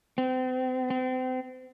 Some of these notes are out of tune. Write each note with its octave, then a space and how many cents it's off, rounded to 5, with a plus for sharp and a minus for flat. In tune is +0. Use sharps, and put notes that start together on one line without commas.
C4 -35
C4 -35